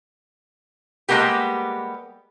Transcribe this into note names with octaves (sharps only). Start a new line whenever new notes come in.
G3 G#3 A#3 B3 G4